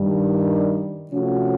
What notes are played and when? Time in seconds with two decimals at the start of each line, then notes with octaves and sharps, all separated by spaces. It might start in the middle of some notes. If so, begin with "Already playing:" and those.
Already playing: G2 D#3 G3
1.10 C3 F3 A3 C#4 F#4